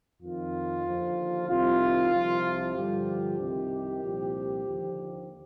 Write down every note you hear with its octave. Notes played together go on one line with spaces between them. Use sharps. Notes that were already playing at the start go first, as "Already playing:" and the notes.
F2 D#3 F4
D#2 D3 F3
C2 C3 D#3 F4
C2 C3 F3
G2 D3 F3 G4
C2 C3 D#3
C2 A#2 F3
D#2 D3 F3